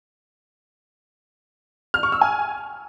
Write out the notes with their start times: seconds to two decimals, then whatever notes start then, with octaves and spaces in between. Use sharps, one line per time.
1.94 F6
2.03 C#6
2.12 E6
2.21 G#5